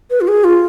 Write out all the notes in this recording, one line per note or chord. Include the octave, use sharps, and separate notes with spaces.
B4
F4
G#4
F4